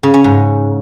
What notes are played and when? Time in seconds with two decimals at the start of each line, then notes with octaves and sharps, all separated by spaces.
0.03 C#3
0.14 C#4
0.24 G#2